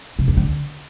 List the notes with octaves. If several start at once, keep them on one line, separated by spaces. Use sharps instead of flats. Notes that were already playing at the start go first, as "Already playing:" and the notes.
C3
E2
D3